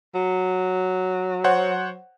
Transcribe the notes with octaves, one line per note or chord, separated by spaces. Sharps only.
F#3
C5 C#5 F#5